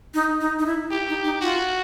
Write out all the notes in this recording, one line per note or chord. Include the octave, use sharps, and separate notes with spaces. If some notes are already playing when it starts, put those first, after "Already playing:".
D#4
D#4
D#4
E4
E4 G4
D#4
D#4
F4 F#4